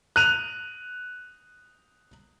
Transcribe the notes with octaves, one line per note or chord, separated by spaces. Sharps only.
F#6 D#7 F7